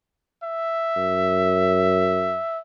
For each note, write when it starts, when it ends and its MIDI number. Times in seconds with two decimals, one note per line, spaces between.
0.43 2.59 76
0.96 2.39 42